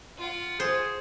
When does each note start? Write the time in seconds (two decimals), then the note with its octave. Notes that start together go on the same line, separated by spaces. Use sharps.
0.18 F4 F#5
0.60 G#4 C5